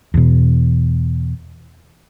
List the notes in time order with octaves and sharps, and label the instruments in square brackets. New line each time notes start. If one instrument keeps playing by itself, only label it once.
[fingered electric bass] E2 B2